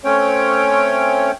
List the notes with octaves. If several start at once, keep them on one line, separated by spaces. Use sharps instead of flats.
A3 C4 C#4 C#5 G5